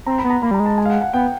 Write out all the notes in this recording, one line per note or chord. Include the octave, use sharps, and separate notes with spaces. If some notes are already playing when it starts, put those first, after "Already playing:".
C4 A#5
B5
B3
A#5
A#3 B5
G3 A#5
G#3
A5
G#5
F5
F#5
F#5
B3 G5